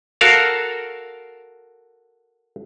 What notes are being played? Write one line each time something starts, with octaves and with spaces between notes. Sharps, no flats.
F#4 A4 A#4 F5